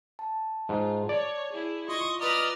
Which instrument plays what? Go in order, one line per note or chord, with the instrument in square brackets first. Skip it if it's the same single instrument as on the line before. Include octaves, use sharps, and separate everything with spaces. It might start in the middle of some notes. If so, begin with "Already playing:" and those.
[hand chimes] A5
[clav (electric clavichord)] G#2 [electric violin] F4
[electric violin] C#5 [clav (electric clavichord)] D5
[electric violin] E4 G#4
[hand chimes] F4 [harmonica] D#5 C6 [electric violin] C#6
[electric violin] B4 F6 [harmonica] D5 D#5 A#5